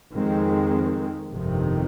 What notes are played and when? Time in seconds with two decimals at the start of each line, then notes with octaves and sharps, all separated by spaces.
0.12 F2 D#3 G#3 C4
1.31 G1 F2 C3 D#3